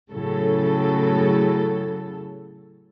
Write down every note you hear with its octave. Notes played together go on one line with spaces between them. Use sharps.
A2 C#3 F#3 A4